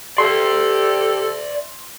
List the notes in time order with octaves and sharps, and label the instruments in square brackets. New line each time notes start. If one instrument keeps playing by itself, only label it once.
[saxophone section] G4 A4 [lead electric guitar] D5 E5 [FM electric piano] C6